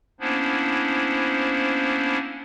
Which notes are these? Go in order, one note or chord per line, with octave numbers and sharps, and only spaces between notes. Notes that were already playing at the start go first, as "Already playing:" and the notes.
A#3 B3 C#4 D4 E4 C5